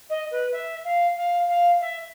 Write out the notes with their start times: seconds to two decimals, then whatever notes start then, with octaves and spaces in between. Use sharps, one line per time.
0.09 D#5
0.31 B4
0.52 E5
0.84 F5
1.16 F5
1.48 F5
1.81 E5